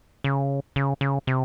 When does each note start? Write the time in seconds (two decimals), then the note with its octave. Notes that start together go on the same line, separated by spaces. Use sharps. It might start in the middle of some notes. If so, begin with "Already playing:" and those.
0.24 C#3
0.76 C#3
1.01 C#3
1.27 C3